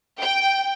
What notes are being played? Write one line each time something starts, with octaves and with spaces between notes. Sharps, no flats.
G5